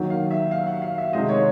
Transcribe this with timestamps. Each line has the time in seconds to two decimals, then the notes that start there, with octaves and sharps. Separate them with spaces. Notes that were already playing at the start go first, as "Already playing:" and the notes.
Already playing: D#3 F#3 A#3
0.10 F5
0.31 E5
0.51 F5
0.67 F#5
0.82 F5
0.98 E5
1.13 C3 D#3 G#3 C4 D#5
1.29 C#5